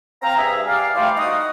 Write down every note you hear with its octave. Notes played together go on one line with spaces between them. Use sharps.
C4 F5 A#5
G2 G#4 E5
G4 G#4 D5 F5
E3 G3 A3 C5 D5 F5
D#4 F#4 D#6